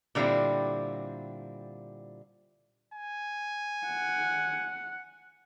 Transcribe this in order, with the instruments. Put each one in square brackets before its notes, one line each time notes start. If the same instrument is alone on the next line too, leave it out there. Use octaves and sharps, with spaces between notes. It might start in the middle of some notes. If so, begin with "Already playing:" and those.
[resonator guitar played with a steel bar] A#2 D3 G3 C4 E4
[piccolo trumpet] G#5
[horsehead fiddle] F#5